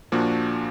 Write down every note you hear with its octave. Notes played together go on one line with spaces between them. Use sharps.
A#2 F3 A#3 D4 F#4